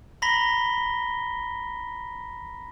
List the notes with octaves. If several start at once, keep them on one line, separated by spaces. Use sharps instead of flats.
A#5 B5 A#6 B6 G7